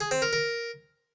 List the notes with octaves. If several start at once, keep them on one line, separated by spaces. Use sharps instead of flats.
G#4
C4
A#4
A#4